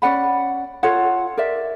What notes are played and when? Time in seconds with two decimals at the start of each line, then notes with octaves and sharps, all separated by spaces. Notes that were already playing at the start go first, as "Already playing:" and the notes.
0.02 C#4 D5 F#5 B5
0.83 F4 A4 C#5 F#5
1.37 A#4 D5 E5